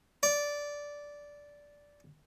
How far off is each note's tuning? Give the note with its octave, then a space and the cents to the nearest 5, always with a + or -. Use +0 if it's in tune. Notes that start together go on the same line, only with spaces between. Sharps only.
D5 -10